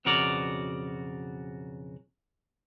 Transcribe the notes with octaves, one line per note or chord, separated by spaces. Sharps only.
B1 F2 C#3 F#4 A#4 D5